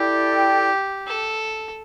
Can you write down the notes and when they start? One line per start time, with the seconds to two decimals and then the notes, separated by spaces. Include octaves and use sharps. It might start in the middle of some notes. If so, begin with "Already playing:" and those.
Already playing: E4 G4 A4 D5 G5
1.07 A4